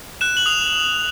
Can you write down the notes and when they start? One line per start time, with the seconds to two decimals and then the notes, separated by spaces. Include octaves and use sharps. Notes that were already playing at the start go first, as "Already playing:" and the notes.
0.21 F#6 E7
0.37 F#7
0.46 D#6 F7